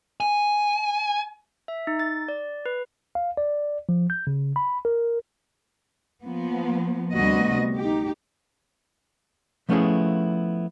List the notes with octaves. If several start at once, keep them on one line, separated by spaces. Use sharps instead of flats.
G#5
E5
D#4
A6
D5
B4
F5
D5
F3
G6
C#3
B5
A#4
F3 A#3 B3
D2 C3 G3 B3 F#4 D#5
D#4 G4
F3 A3 B3 C#4 E4 G#4